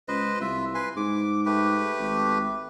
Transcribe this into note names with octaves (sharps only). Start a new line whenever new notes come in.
C#2 B4 C5 D#5
C2 F4 E5
B4 G#5 C6
G#2 D6
A3 G4 B4
G#1